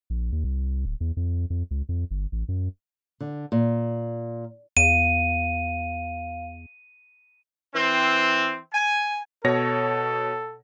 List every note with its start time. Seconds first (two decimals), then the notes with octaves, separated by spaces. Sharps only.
0.10 A#1
0.32 D#2
0.44 C2
0.85 D1
1.01 E2
1.17 F2
1.50 F2
1.71 C#2
1.89 F2
2.11 G1
2.32 A1
2.48 F#2
3.20 D3
3.52 A#2
4.77 E2 F5 D#7
7.74 E3 C4
8.73 G#5
9.44 B2 A4 C#5 A#6